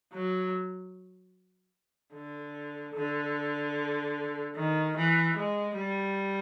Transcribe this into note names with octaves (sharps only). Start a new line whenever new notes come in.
F#3
D3
D3
D#3
E3
G#3
G3